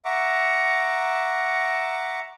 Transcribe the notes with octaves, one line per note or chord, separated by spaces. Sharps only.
E5 F#5 A#5 C#6 D6